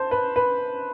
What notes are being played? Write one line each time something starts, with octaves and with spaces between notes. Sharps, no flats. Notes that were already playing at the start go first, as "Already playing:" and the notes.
Already playing: C5 A5
B4
B4